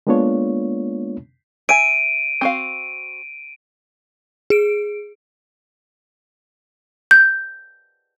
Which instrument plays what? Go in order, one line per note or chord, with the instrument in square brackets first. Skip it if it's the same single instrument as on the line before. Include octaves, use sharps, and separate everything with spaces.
[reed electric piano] G#3 A#3 B3 D4 F4 C#5
[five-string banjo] E5 G#5 [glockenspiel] D7 D#7
[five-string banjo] C4 F#4 F5
[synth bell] G#4 D7
[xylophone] G6